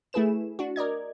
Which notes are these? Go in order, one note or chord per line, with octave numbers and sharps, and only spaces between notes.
A3 E4 G#4 B4 E7
D4 F#4
A#4 D5 D#5 G#6